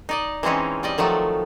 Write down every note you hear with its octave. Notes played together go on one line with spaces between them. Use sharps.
D#4 D5 D#5
E3 G#3 C4 C#4 D#4
G3 D5 D#5
D#3 F3 F#3 A3 D5